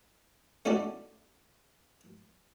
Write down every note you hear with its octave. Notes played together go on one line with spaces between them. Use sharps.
A3 C#4 D#4 E4 F#4 D5